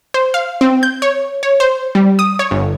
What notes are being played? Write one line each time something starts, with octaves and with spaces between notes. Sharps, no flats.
C5
F5
C4
G6
C#5
C#5
C5
G3
D#6
C#5
G1